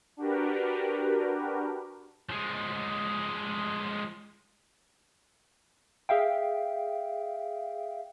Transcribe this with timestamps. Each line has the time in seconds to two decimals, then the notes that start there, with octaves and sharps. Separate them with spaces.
0.17 D4 F#4 G4 A#4 B4
2.30 F3 G#3
6.09 G#4 E5 F5 G5